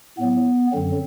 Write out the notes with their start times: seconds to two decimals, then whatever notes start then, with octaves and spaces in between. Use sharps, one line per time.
0.18 A2 F#3 B3
0.72 F#2 D3 F#3 C4